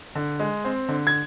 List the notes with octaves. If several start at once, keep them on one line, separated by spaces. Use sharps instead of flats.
D3
G#3
C4
D3
G#6